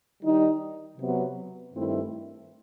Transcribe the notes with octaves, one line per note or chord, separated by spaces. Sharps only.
D#3 G3 D#4
C3 F#3 B3
G2 D#3 A3 C4 E4